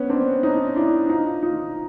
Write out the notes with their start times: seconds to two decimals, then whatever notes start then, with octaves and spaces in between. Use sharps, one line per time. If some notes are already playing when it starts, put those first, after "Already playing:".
Already playing: B3 C#4
0.09 C4 D4
0.43 C#4 D#4
0.76 D4 E4
1.09 D#4 F4
1.43 D#4 F4